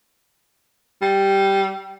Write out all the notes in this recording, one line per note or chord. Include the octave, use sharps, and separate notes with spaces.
G3